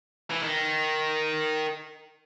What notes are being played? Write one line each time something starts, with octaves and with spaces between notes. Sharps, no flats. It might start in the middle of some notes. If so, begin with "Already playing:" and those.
E3
D#3